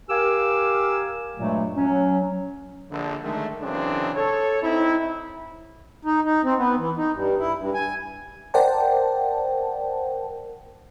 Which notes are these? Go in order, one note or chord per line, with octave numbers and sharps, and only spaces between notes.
G4 A#4 F5 G#5 D6 E6
G2 A#2 F#3 G#3 A3
F#3 C#4
A#1 D3
D3 D#3 G#3 A3
F#2 C#3 E3 C4 D4
A4 C#5
C4 D#4 E4
D#4
D#4
C4
B3
E3
D#4
G2
E4
G2
G#5
A#4 C5 D5 F#5 G5 A5